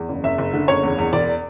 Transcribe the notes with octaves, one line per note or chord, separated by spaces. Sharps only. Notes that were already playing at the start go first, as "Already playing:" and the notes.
Already playing: E2
F#1
F#1 E5
F#1
D3
F#1 C#5
E2
E2
E1 D5